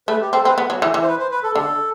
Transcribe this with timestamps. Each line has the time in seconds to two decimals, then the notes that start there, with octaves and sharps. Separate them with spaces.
0.08 A3 B4
0.21 G4
0.33 C4 A4
0.45 C4 B4
0.58 B3
0.70 F#3
0.82 E3
0.94 E3
1.02 C5
1.07 B4
1.19 C5
1.31 B4
1.43 A4
1.55 D3 A4